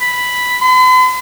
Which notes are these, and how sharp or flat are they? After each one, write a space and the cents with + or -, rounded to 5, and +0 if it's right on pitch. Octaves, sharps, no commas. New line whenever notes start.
B5 +0
B5 +45